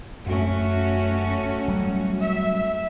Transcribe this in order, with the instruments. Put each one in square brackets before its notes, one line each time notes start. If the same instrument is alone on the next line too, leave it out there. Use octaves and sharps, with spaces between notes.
[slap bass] F#2 [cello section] A3 C#4 F#4
[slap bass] F#3 G3
[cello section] E5